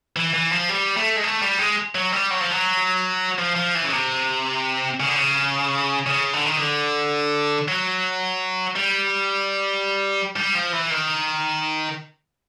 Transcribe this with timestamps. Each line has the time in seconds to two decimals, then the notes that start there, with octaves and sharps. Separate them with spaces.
0.16 E3
0.34 E3
0.52 F3
0.69 G3
0.96 A3
1.16 G#3
1.24 A3
1.42 G3
1.59 G#3
1.95 F#3
2.12 G3
2.30 F#3
2.41 F3
2.51 F#3
3.38 F3
3.56 F3
3.75 E3
3.84 C#3
3.92 C3
5.00 C#3
5.08 D3
5.16 C#3
6.07 C#3
6.34 D3
6.45 D#3
6.57 D3
7.68 F#3
8.76 G3
10.36 G3
10.55 F3
10.73 E3
10.91 D#3